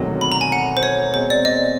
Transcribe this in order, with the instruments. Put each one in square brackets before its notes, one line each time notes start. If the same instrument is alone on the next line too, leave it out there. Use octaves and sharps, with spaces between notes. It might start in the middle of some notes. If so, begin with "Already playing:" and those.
Already playing: [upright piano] E1 D2 C3 D#3 F#3
[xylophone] B5
A#5
G#5
F#5
C5
C#5
[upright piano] B2 G#3 C4 [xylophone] C5
[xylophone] D5
D#5